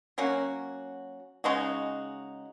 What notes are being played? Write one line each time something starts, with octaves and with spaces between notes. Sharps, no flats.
F#3 A#3 C#4 F#4
C#3 G#3 D#4 F#4